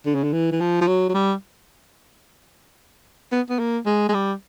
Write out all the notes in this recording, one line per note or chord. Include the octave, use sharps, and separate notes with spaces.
D3
C#3
D3
E3
E3
F3
F3
F#3
F#3
G3
B3
B3
A#3
G#3
G#3
G3